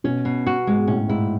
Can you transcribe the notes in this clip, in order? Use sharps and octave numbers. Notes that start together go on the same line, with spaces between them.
B2 C#4
B2
F#4
G#2 G#3
A2 C#4
G#2 E4